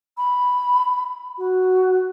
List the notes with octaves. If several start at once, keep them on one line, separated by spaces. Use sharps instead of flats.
B5
F#4